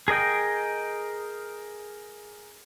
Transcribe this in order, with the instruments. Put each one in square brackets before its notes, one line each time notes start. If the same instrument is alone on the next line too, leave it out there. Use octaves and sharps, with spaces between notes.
[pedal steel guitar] G#4 A#4 D#5 G5